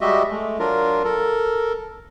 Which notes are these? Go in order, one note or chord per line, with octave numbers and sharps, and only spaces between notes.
G3 G#3 F#4 G4 D#5 E5
G#3 A3
F#3 D4 F4 A#4
A4 A#4